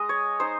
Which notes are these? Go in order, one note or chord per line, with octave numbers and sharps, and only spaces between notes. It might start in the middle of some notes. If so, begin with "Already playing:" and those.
Already playing: G#3 D#5
C#5
D#4 C5